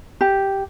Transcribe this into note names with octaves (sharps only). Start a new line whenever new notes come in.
G4